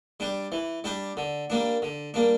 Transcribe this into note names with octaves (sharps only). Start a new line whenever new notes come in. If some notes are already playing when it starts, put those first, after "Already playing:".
G3 D4 G4
E3
G3 D4 G4
D3
G3 A#3 D4
D3
G3 A#3 D4